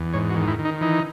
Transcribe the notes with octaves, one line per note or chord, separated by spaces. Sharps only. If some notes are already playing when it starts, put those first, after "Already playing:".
Already playing: E2
G#2 C#5
F#4
D#3
E4
D#3
D#4
E3 D#4